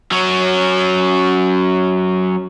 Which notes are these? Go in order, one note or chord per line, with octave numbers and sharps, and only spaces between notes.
F#3 C#4